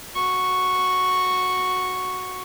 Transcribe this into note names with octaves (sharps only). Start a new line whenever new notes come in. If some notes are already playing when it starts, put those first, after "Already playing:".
F#4 C#6